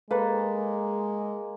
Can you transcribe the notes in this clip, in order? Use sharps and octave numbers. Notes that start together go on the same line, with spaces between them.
G#3 A#3 A4 B4